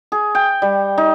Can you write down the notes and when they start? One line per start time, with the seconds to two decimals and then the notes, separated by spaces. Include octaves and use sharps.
0.12 G#4
0.35 G5
0.62 G3
0.98 D#4